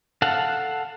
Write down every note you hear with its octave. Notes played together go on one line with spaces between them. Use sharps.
A4 F5 F#5 A5